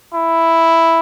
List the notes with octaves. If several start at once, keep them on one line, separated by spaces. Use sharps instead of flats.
E4